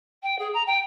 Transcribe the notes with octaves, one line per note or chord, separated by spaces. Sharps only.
G5
G#4
A#5
G5